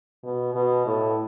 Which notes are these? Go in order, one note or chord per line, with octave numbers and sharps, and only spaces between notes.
B2
B2
A2